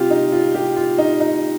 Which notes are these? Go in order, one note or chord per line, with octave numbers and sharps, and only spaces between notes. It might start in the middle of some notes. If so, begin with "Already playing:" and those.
Already playing: C3 G3 F4 G4
D#4
F4
G4
F4
D#4
D#4